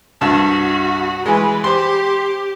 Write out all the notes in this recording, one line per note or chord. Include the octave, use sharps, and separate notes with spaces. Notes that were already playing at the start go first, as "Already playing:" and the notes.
C2 G2 F#4 A5
E3 G#3 B4
G4 C5 C6